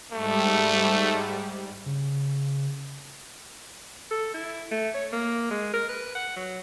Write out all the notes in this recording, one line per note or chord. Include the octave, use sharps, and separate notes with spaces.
G#2 G3 A3
C#3
A4
E4
A3
C#5
A#3
G#3
A#4
B4
F#5
F#3